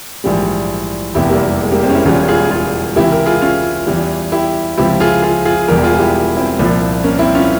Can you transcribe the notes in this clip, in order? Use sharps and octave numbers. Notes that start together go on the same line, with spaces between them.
A#1 G#2 E3 G3
F1 E2 C3 E4 G4
G3 A#3
G3
G#3
G3 A#3
G#3 C4
C#4
C4 E4
E1 E2 E3 G3 C#4 F4
F4 G#4
F4 G#4
C#2 C3 E3 E4 G4
G4 A#4
F4 G#4
C#4 F4
E2 E3 G3
E4 G4
C#2 C3 F3 E4 G4
F4 G#4
F4 G#4
F4 G#4
E1 E2 E3 G3 G4 A#4
F4 G#4
E4 G4
C4 E4
C2 A#2 F3
A#3 C#4
C4 E4
C#4 F4